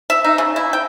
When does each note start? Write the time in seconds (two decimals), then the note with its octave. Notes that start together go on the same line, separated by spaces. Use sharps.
0.10 E5
0.24 D#4
0.38 C#3
0.56 E4
0.73 G5